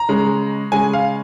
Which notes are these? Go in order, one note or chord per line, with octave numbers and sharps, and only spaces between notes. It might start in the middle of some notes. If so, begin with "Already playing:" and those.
Already playing: A#5
C#3 G#3
C#3 G#3 G#5
F5